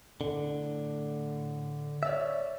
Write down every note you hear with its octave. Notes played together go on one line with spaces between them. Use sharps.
A2 D3
C#5 D5 E5